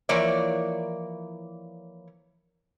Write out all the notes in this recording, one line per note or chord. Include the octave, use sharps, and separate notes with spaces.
E3 F3 A#3 C#5 D5